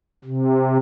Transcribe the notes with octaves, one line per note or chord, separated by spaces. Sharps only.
C3